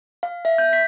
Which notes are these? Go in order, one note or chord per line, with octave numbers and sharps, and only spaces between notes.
F5
E5
G6
B6